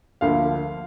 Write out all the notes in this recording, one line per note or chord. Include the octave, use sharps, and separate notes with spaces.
D2 D3 F3 A#3 F5